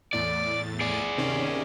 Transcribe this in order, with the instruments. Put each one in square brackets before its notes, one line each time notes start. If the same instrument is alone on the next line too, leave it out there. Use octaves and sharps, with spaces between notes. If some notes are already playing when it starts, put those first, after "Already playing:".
[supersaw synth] E2 A2 A6 [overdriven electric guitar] D5
[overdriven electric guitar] G#4 D5
[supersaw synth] C3 D#3 C#4